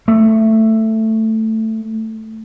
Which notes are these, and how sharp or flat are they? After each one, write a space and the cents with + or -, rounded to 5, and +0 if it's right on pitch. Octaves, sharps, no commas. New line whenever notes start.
A3 +10